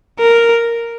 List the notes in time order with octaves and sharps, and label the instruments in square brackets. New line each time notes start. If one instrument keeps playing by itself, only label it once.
[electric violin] A#4